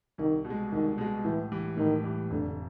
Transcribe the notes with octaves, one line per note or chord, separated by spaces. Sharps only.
C2 D#3
B2
G#3
C2 D#3
B2 G#3
A2 E3
E3 G3
A2 D#3
E3 G3
F1 D3